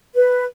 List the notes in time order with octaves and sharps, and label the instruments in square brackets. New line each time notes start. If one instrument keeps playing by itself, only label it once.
[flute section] B4